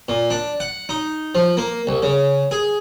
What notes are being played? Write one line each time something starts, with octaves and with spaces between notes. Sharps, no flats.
A#2
D4
F#5
D#4
F3
A#3
C2
C#3
G#4